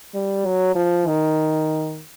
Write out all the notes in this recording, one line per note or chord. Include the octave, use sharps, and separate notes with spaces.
G3
F#3
F3
D#3